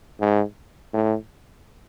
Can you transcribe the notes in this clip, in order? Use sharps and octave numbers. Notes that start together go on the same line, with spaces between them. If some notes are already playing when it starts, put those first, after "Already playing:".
G#2
A2